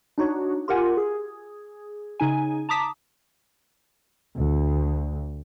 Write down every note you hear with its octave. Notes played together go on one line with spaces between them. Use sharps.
D4 D#4 F#4 C#5
F4 G4 A#4 F#5 G#5
G#4
C#3 D#4 G#5
A5 A#5 D6 D#6 B6
D2